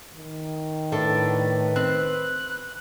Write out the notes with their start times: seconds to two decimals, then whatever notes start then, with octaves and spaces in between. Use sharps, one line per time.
0.16 D#3
0.92 A2 D4 A4 B4
1.76 C4 F#6